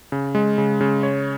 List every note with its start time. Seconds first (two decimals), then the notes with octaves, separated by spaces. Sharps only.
0.12 C#3
0.35 G#3
0.58 C#3
0.81 C#3
1.03 C#5